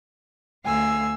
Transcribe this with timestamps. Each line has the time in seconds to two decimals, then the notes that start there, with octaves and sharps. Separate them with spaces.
0.65 D2 F5 G#5 E6